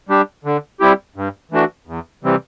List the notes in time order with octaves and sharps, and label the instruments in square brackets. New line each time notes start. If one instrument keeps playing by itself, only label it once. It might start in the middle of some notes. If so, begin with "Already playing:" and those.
[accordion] G3 D4 G4
D3
G3 C4 E4 G4
G2
E3 A3 D4 F#4
E2
C3 E3 G3 C4